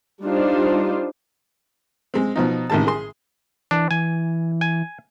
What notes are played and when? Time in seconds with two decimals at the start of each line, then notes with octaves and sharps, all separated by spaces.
0.24 G3 D4 D#4 F4 C5
2.14 G#3 C4
2.36 B2 F3 D#4
2.70 A1 C3 D#3 G#3 A5
2.87 G#4 C6
3.71 E3 D4
3.91 E3 G#5
4.61 G#5